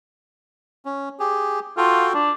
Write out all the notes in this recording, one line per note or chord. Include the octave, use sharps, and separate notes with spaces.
C#4
G4 G#4
F4 F#4 A4 G5
D4